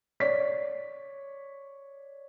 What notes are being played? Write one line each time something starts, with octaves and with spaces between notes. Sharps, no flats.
C#5 D5 B6